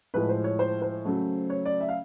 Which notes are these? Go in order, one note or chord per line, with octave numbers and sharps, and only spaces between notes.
A2 F3 G#3 B4
C5
C#5
C5
C5
C#3 F#3 A3
C#5
D5
E5
F5